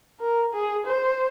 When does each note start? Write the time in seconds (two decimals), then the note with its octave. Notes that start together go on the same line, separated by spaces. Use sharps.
0.20 A#4
0.53 G#4
0.86 C5